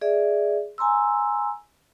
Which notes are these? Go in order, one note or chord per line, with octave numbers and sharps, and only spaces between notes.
G#4 D5 E5
G#5 A#5 C6 E6